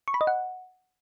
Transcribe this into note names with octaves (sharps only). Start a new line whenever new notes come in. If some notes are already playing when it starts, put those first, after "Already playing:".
C#6
B5
D#5
F#5